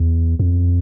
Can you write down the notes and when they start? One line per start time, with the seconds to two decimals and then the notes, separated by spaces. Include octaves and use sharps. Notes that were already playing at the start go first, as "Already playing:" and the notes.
Already playing: E2
0.39 F2